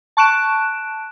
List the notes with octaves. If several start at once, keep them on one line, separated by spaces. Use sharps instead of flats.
A5 C#6 F#6 D7 E7